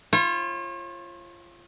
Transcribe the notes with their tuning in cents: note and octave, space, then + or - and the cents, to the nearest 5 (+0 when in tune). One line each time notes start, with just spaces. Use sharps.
F4 -20 C#5 -40